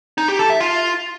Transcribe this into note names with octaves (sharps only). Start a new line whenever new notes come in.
D#4
G4
A4
E5
F4